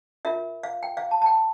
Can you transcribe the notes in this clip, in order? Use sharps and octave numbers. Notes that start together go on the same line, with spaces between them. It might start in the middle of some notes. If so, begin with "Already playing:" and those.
F4 A#4 E5
F5
G5
F5
A5
A5
G5